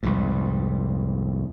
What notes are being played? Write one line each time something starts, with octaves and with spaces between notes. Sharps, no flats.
C2 F2 G#2